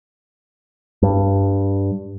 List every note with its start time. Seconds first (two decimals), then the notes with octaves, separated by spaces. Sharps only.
1.02 G2